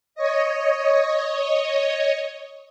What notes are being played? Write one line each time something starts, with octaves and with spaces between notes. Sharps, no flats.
C#5 D#5